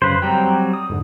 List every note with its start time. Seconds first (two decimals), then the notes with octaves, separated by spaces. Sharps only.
0.02 F#2 C#3 B4 C5
0.22 F#3 G3 C4 G5 A#5
0.74 D#6
0.90 F2 G#2 D3